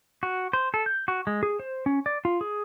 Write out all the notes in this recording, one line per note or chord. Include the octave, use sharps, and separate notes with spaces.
F#4
C5
A4
G6
F#4
G#3
G#4
C5
C#4
D5
F4
G#4